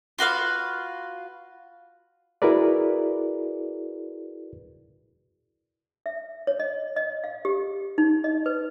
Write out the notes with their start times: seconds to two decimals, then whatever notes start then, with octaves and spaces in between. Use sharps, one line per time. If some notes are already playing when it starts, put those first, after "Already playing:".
0.19 F4 F#4 B4 F5
2.42 E4 F#4 G#4 A#4 B4 D5
6.06 E5
6.47 C#5
6.60 D#5
6.96 D#5
7.24 F5
7.45 G4
7.98 D#4
8.24 D#5
8.46 B4